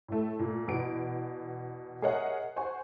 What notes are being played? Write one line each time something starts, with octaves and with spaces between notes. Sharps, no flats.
A2 A3
A#2 A3
E2 B2 D7
G#4 A#4 C#5 D#5 E5 F#5
C5 F#5 G#5 C#6